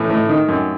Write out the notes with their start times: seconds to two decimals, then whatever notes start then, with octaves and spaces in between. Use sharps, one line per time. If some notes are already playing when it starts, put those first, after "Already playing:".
Already playing: A2 E3
0.10 A2
0.29 D#3
0.49 F#2